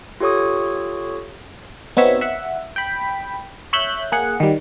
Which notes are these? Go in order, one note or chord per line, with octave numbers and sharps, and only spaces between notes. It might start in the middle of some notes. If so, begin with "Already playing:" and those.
F4 G4 A4 C#5 C#6 D#6
B3 C4 D#4 F#4 C#5 E5
E5 F#5
G5 B5
C#5 E5 F#6 G6
A#3 G#4 F#5
D#3 G3